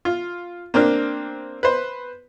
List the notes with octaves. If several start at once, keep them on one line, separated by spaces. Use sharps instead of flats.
F4
A#3 C4 D4 F6
B4 C5